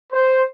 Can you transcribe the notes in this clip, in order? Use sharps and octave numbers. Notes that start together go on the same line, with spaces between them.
C5